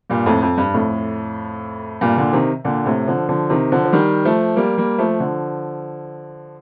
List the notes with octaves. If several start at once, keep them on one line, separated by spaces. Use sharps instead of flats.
G2 A#2
F2 A2
F2
G2
F2 A2
G2 A#2
A#2 D3
C3 D#3
A#2 D3
A2 C3
D3 F3
D3 F3
C3 D#3
D3 F3
F3
D#3 G3
F3 A3
G3 A#3
G3 A#3
F3 A3
D3 F3